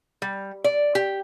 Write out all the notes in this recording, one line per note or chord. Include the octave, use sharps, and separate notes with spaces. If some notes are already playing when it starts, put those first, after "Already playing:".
G3
D5
G4